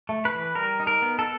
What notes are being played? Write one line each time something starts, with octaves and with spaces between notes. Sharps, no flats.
A3
B4
E3
G3 A#4
D#4
A#4
B3
A4